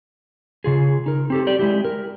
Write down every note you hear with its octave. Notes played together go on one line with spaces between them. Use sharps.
C#3 F4 G#4
D#4 A#4
C4 G4 A4
G4 D5
G#3 E4 G4
A#4